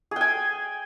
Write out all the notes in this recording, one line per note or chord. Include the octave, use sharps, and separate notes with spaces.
G#4 G5 G#5